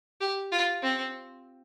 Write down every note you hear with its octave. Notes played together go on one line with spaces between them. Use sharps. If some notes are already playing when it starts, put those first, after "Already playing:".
G4
F4
C4